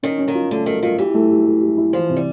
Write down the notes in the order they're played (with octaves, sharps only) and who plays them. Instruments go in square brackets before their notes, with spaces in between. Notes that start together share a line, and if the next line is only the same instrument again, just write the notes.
[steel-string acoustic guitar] D#3 [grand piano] C#4
[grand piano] C#4
[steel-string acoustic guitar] D#3
[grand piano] F4
[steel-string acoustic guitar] D3 [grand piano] A3
[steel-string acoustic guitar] D#3 [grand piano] A4
[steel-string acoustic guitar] D#3 [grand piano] F4
[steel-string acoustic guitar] E3 [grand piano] G4
[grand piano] A3
G4
A3
G4
E4
[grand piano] E3 [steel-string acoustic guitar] F3
[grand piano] C3
[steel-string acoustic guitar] G3